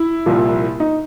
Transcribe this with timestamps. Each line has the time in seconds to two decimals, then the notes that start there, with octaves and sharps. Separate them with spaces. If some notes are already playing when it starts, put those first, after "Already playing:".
Already playing: E4
0.26 C2 A#2 F3 A#3
0.80 D#4